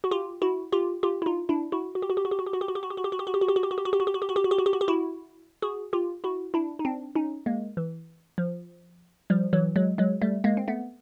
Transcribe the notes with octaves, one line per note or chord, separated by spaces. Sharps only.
F#4
F4 G4
E4 F#4
F4 G4
F4 G4
E4
D#4 F4
D4 E4
E4 F#4
F#4
G4
F#4
G4
F#4
G4
F#4
G4
F#4
G4
F#4
G4
F#4
G4
F#4
G4
F#4
G4
F#4
G4
F#4
G4
F#4
G4
F#4
G4
F#4
G4
F#4
G4
F#4
G4
F#4
G4
F#4
G4
F#4
G4
F#4
G4
E4 F#4
F#4 G#4
F4 G4
E4 F#4
D4 E4
D#4
C4 D4
C#4 D#4
G#3 A#3
E3
F3
F3 G3
E3 F#3
F#3 G#3
F#3 G#3
G3 A3
G#3 A#3
C4
A3 B3